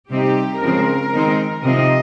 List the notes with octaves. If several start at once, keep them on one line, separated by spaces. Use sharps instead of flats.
C3 G3 C4 D#4 G4
C#3 F3 G#3 C4 A#4
D#3 G#3 C4 D#4
C3 F3 C4 D#4 D#5